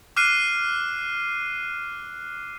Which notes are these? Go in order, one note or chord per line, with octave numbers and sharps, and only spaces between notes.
D6 F6 F#6 C7 D#7